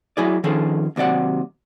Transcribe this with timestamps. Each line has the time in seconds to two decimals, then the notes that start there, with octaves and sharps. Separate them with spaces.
0.17 F#3 E4 G#4 D5
0.44 D#3 F3 C#4 G#4 A4
0.96 D#2 C3 F#3 D5 F#5